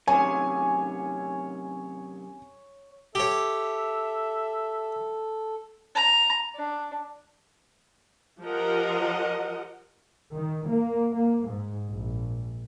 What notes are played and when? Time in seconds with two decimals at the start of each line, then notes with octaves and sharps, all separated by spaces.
0.07 F#2 C3 D#3 C#5 G#5
3.15 G4 A4 C#5 E5
5.95 A#5
6.55 D4
8.43 F3 G4 A#4 D#5 F#5
10.35 D#3
10.68 A#3
11.15 A#3
11.47 G#2
11.91 A#1